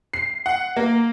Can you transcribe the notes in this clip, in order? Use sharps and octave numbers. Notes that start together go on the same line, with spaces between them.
C7
F#5
A#3